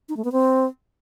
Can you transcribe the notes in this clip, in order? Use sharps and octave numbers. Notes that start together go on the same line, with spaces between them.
D#4
A3
B3
C4